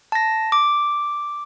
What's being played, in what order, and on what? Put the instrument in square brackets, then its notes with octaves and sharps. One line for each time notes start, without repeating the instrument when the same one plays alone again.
[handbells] A5 A#6
D6